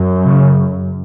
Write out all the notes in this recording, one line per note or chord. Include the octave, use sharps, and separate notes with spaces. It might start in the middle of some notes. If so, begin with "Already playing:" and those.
Already playing: F#2
C#3